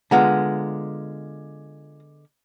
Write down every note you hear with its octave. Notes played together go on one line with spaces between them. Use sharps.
D3 G#3 B3 F4 F#5 A#5